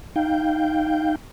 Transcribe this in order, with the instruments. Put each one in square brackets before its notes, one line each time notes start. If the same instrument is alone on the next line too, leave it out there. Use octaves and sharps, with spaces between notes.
[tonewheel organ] D#4 F5 G5 G6